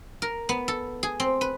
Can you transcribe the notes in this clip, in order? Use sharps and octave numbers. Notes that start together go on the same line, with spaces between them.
A#4
B3
A4
G#4
C4
B4